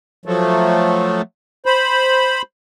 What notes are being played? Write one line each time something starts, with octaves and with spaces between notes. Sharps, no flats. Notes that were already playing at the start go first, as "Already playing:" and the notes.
F3 F#3 A3
C5 B5